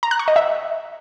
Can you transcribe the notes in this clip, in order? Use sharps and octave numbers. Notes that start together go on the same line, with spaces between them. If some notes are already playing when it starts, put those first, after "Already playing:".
A#5
F#6
C#6
D#5
E5